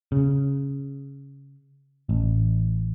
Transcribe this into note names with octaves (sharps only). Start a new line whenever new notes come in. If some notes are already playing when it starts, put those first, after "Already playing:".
C#3
A1